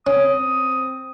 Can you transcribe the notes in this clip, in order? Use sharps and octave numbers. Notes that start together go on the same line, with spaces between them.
C4 C#4 D#6